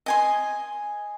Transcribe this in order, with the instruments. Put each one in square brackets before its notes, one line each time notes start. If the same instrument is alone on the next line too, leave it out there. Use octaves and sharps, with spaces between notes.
[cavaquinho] D#5 G#5 C6